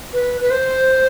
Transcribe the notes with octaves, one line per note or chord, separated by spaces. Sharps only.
B4
B4
C5